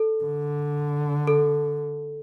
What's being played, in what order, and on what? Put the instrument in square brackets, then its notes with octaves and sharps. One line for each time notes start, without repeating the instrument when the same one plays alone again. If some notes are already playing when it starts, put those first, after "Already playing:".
Already playing: [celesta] A4
[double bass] D3
[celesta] A4